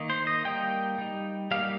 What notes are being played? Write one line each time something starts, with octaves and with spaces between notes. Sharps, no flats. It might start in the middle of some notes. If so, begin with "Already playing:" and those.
Already playing: D#3 A#3 D#4
C5
D#5
G3 A#3 D#4 G5
G3 D#4
G3 A#3 D#4 F5